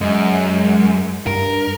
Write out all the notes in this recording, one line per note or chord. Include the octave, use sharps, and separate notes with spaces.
F#2 G#3
G2 A#4